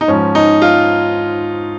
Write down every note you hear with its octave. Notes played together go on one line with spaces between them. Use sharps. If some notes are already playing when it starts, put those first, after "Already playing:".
D#4
G#2 F3 C#4
D#4
F4